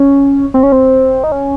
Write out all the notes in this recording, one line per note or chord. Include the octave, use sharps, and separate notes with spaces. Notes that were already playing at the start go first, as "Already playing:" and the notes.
Already playing: C#4
C4
C#4
C4
D#4
C#4